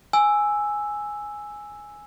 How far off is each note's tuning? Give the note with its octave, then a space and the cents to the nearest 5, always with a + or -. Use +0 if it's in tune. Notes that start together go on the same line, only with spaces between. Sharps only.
G#5 +0 E6 +0